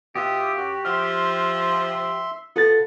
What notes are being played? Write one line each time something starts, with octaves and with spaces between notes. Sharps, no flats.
B2 F4 G4 E5 D#6
F#2 F#4
F3 E5 C6 F6
B3 F4 A4 A6